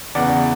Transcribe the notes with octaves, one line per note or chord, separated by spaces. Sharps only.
E2 C#3 E3 D5 F#5